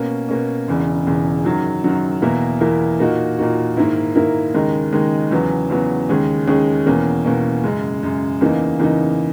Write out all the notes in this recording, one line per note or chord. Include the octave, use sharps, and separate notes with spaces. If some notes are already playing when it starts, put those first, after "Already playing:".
Already playing: B2 A#3 C#4
B2 A#3 C#4
E1 E2 C#3
E1 E2 C#3
F#2 D#3 F#3
F#2 D#3 F#3
E2 B2 A#3 E4 A#4
E2 B2 A#3 E4 A#4
A#2 A#3 D#4 F#4
A#2 A#3 D#4 F#4
G#2 D#3 A#3 E4 A#4
G#2 D#3 A#3 E4 A#4
D#2 C#3 G#3 D#4 A#4
D#2 C#3 G#3 D#4 A#4
E2 C#3 F#3 B3
E2 C#3 F#3 B3
D#2 C#3 G#3 C#4 G#4
D#2 C#3 G#3 C#4 G#4
E2 B2 A#3 C#4
E2 B2 A#3 C#4
F#2 C#3 G#3
F#2 C#3 G#3
E2 C#3 E3 A#3 D#4
E2 C#3 E3 A#3 D#4